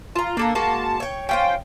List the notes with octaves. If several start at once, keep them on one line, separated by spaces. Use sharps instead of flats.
F4 A5 A#5
A#3 D4 A4 A#4
G#3 A#3 F#4 A5
C#5 G5
C#4 F4 C5 G5